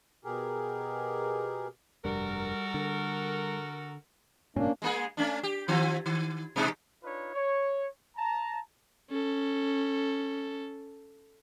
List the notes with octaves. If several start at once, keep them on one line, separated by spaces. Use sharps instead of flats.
B2 G4 G#4 A#4
F1 G2 G3 F#4 A4 A#4
D3
F#1 G#2 B2 A#3 C#4 D4
G#3 A#3 G#4
A3 C#4 D4
G4
D#3 F3 C4
D#3
B2 G#3 D#4
D4 D#4 F4 B4 C#5
C#5
A5 A#5
C#4 A4